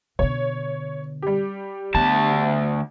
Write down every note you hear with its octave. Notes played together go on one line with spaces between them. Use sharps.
B2 D3 C#5
G3 G4
D2 B3 A5